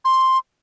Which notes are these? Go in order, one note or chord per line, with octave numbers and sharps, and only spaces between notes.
C6